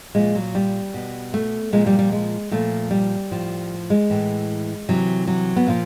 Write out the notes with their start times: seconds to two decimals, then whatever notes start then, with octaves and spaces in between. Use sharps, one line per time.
0.15 A#2 F3 G#3
0.35 F#3
0.55 G3
0.94 B2
1.34 A3
1.72 A#2 F3 G#3
1.86 G3
1.99 G3
2.12 G#3
2.51 A#2 F3 A3
2.91 G3
3.31 A2 F3
3.90 G#3
4.10 A2 E3
4.89 C3 E3 F#3
5.27 F#3
5.56 B3
5.67 A#2 F3 A#3